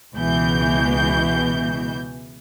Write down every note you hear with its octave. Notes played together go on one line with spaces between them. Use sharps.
C#2 B2 E3 G6